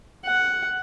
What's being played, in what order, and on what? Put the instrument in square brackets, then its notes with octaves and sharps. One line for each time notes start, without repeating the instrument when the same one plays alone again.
[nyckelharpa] F#5